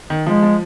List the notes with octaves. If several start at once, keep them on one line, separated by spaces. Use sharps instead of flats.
D#3
F3 G#3
F3